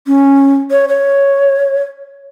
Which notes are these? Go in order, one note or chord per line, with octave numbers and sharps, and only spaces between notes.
C#4
C#5
C#5